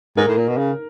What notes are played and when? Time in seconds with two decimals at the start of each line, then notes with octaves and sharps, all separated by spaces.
0.17 G#2 A#4
0.28 A2
0.37 A#2
0.48 B2
0.57 C#3